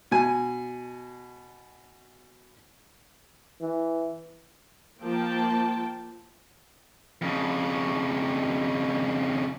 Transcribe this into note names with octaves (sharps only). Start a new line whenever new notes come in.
B2 G#5
E3
F3 A#3 G5 A5
F2 C#3